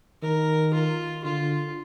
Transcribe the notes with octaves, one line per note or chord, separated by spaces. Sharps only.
D#3 A#4
F4
D3 F4